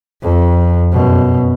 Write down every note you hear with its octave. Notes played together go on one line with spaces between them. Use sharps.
F2
F#2 B2